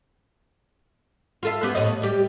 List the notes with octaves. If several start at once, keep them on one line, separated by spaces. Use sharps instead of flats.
F4 A4 E5
B3 G4
A2 C#5 D#5
G3 G4